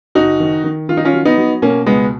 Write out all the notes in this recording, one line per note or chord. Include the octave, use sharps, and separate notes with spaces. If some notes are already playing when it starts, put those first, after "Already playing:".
F#1 D#4 F#4
D#3
D#3
D#3 F4
D#4
C#4 F4
F#3
B3 D#4
F#3
B2 A#3 C#4
C#2 G#3 B3